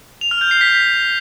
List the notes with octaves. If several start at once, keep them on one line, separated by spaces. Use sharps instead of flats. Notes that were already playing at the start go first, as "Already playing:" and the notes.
F7
F6
G6
C7
B6